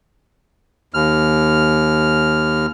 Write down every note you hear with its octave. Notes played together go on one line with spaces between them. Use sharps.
D#2 F6